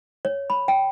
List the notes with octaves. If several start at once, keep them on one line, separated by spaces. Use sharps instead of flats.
C#5
B5
G5